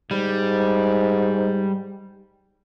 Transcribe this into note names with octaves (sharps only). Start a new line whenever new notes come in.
G#2 G3